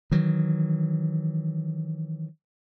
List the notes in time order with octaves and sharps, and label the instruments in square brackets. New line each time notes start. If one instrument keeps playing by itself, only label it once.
[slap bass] D#3 E3 F#3